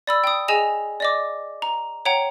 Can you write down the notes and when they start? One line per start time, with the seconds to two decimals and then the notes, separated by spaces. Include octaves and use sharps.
0.07 D5 B5 E6
0.24 G5 D#6
0.48 G#4 D#5 G#5 E7 F7
1.00 D5 D#5 D6
1.62 A#5
2.05 C#5 F#5 G5 A#5